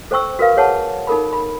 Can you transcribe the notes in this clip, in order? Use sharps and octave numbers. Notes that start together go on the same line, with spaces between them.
A4 C5 G5 C#6 E6
F#4 A#4 B4 F5
G#4 B4 C#5 F#5 G#5 A5
D#4 A4 A#4 B5
B5